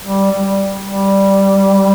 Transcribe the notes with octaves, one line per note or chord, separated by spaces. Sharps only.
G3
G3
G3